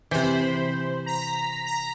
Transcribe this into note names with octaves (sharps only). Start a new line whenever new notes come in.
C3 E3 C5 B5
A#5 B6
A#5 B6